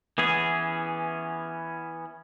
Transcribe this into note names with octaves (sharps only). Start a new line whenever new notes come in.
E3 B3 C#4 G#4